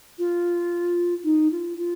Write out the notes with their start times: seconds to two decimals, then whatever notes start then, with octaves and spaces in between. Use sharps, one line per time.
0.18 F4
1.24 D#4
1.51 F4
1.77 F4